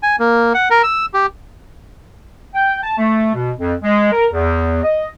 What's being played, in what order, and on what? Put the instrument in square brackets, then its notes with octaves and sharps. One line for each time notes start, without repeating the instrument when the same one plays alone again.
[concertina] G#5
A#3
F#5
A#4
E6
G4
[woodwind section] G5
A5
A3
B2
F2
G#3
A#4
E2
D#5